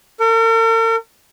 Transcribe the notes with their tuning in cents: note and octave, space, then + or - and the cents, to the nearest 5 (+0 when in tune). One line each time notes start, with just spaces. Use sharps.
A#4 -45